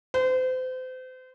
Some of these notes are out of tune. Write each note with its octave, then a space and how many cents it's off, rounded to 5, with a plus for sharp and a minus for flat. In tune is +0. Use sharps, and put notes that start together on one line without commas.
C5 -35